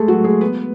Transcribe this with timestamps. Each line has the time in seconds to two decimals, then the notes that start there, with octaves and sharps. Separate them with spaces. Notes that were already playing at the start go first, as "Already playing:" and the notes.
Already playing: G#3 A3 G#4 A4
0.08 F#3 F#4
0.24 G#3 G#4
0.41 B3 B4